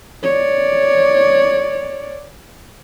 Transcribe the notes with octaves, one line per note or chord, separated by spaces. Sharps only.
C#5 D5